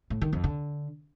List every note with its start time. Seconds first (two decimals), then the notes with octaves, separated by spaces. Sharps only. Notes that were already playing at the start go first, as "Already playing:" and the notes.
0.10 A2
0.21 D#3
0.33 F2
0.44 D3